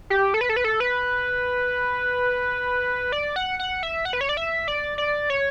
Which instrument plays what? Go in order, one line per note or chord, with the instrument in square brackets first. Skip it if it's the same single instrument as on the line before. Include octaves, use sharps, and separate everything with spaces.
[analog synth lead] G4
A4
B4
A4
B4
A4
B4
D5
F#5
F#5
E5
F#5
B4
C#5
D5
E5
D5
D5
C#5